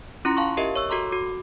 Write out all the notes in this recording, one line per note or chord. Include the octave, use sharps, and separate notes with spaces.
C#4 E4 F4 A#5 C6 C#7
F5 A5 C6 C#6
G4 A#4 D#5 E5
C#5 C#6 E6
F#4 A4 A#5 C6 D6
F#4 D6